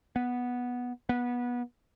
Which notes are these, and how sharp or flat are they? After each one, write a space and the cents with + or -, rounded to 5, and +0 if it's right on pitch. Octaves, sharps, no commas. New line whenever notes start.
B3 -5
B3 -20